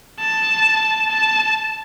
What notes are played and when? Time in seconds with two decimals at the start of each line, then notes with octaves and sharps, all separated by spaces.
0.20 A5
1.10 A5